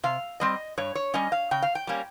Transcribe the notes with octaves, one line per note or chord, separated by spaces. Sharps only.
C3 F5
G3 C4 D#5
G2 C#5
C#5
G3 C#4 D#5
F5
C#3 G5
F5
G5
G3 A#3 C#4